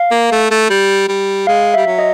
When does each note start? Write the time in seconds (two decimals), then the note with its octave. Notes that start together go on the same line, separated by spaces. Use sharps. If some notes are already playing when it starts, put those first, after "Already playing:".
Already playing: F5
0.11 A#3
0.31 A3
0.51 A3
0.70 G3
1.08 G3
1.47 G#3 F5
1.74 E5
1.77 G3
1.86 F#3
1.99 D#5